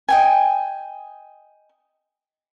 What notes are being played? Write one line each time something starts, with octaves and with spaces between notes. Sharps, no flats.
D#5 G5 G#5